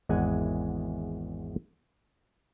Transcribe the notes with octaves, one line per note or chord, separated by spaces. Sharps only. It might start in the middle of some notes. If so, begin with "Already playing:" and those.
G#1 E2 G#3 E4 F#5 G#5